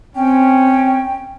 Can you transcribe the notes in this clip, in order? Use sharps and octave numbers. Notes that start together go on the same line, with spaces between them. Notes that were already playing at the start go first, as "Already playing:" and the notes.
C4 C#4 G5